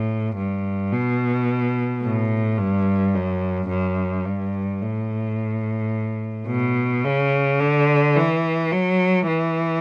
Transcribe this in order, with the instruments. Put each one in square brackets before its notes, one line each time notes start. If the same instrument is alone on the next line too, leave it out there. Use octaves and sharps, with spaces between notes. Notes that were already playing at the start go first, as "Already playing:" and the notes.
Already playing: [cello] A2
G2
B2
A2
G2
F#2
F#2
G2
A2
B2
C#3
D3
E3
F#3
E3